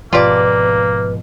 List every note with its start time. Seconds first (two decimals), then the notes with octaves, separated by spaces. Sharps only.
0.13 G#2 B2 F3 A#3 F4 G4 B4 D5